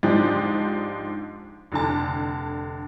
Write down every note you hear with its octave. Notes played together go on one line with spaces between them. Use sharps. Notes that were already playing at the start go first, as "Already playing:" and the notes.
G#2 F3 D4 D#4 G4
F1 D3 A5